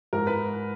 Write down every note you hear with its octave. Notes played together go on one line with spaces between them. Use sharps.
G#2 A#4
B4